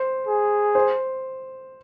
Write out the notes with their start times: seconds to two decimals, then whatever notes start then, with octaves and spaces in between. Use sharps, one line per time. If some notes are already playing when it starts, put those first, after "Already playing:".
Already playing: C5
0.27 G#4
0.75 C5